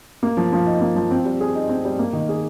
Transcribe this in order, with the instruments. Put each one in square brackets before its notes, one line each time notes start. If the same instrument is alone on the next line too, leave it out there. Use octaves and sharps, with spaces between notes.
[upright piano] A#3
F3
F3
D#4
A#3
F3
C4
G3
G#4
D#4
C4
G3
A#3
D#3
G#4